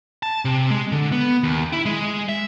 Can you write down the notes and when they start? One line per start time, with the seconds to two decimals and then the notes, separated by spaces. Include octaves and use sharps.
0.23 A5
0.45 C3
0.70 G#3
0.92 D3
1.12 B3
1.43 D#2
1.73 E4
1.85 G#3
2.29 E5